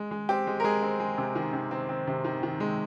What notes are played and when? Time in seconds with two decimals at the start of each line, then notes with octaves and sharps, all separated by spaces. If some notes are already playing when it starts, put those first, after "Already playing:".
Already playing: G#3
0.11 G#3
0.29 C4 G4
0.47 G#3
0.60 A#4
0.64 G#3 G#4
0.83 C4
1.00 G#3
1.18 C3
1.35 D#3
1.53 C3
1.71 C4
1.89 C4
2.07 C3
2.25 D#3
2.43 D#3
2.60 G#3